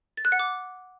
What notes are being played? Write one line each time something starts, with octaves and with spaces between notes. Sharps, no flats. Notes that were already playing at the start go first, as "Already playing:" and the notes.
A6
F#6
F#5
D6